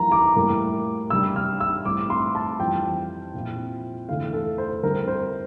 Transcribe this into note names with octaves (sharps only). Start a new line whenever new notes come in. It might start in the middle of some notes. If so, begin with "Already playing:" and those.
Already playing: F2 E3 G3 A#3 A#5
D6
A2 G3 A#3
C3 G3 D4 E6
F6
E6
A2 G3 C4 D6
C6
A5
F2 E3 G3 C4 G5
A#2 F3 C4 E4
E2 D3 A3 D4 F5
A4
C5
D3 G3 C4 E4 A#4
C5